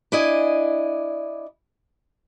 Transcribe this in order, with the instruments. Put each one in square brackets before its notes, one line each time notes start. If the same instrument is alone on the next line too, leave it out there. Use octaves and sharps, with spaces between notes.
[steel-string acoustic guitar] D4 E4 D5 D#5 G#5